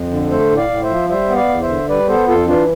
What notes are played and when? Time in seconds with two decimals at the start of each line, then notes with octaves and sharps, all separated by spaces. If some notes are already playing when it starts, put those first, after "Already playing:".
Already playing: F2
0.10 D3
0.31 A3 A4 C5
0.50 A2
0.56 D5 F5
0.70 A2
0.83 C5 E5
0.89 F3
1.09 G3 C5 E5
1.29 B3
1.35 D5 F5
1.49 E2
1.62 C5 E5
1.69 D3
1.89 G3 B4 D5
2.08 B3 A4 C5
2.27 F2 F4 A4
2.47 E3 D4 F4